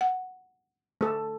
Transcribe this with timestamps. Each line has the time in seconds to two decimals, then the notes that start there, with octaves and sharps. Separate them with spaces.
0.01 F#5
1.01 A3 A4